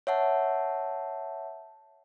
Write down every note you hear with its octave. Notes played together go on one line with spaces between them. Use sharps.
C#5 E5 F#5 A5